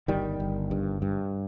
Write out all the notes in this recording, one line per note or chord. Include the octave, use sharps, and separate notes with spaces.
G1 D#3 G3
G1
G2
G2